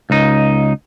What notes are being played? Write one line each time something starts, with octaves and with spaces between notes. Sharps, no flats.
C#2 D#4